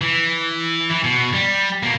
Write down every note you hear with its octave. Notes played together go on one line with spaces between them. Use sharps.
E3
E3
B2
G3
B2 A#3